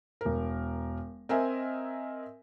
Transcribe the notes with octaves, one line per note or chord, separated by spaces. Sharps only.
E1 A#4
C4 A#4 D#5 E5 G#5